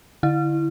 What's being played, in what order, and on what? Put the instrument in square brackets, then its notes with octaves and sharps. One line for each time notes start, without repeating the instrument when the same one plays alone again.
[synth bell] D3 E4